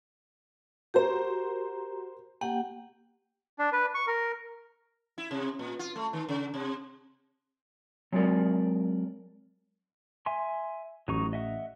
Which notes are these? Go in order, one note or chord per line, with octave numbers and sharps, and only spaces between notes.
F#4 G4 A#4 C5 A#5
A#3 G4 F#5 G5
D4
B4
C#6
A#4
E4
C3
A#2
F4
A3
D#3
C#3
C3
F#3 G#3 C4 A#4 D5
E5 G#5 C6
A1 F#3 D#4 C#6
D#5 E5 F#5